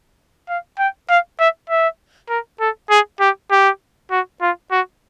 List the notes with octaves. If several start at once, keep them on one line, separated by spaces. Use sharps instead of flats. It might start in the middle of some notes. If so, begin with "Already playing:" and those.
F5
G5
F5
E5
E5
A#4
A4
G#4
G4
G4
F#4
F4
F#4